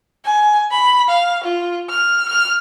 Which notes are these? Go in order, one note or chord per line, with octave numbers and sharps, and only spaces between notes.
G#5
B5
F5
F4
F6
F6